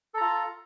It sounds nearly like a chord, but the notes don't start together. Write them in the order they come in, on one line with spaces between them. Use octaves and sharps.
A4 A#5 F4